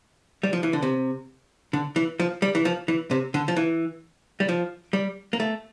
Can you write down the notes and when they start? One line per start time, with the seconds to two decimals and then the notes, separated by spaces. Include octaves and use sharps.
0.43 G3
0.53 F3
0.63 E3
0.73 D3
0.82 C3
1.73 D3
1.96 E3
2.20 F3
2.42 G3
2.55 E3
2.65 F3
2.88 E3
3.11 C3
3.34 D3
3.48 F3
3.56 E3
4.40 G3
4.49 F3
4.93 G3
5.33 A#3
5.40 A3